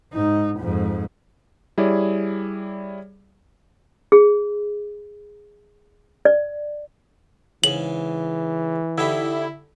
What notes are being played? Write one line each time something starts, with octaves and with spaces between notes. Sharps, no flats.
G#2 D#4
F2 G#2
G3 E4 G#4 C#5 D5
G#4
D5
G#2 C#3 E3 F#7
D3 D#4 E4 G4